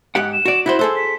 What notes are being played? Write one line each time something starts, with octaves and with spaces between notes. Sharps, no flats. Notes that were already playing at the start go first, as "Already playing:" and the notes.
G#2 G4 F#5 F#6
E7
F#4 D5
E4 F#4 C5 B5
G#4 A4 C5 E6
B6